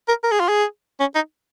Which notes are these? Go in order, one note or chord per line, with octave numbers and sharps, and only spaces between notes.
A#4
A#4
G#4
F4
G#4
C#4
D#4